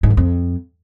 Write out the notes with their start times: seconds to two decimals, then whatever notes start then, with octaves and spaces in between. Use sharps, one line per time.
0.03 G#2
0.10 F#2
0.17 F2